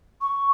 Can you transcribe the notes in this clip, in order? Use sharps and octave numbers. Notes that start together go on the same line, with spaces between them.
C#6